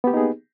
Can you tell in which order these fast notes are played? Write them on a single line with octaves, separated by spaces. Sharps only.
B3 G4 A#3 D#4 G#4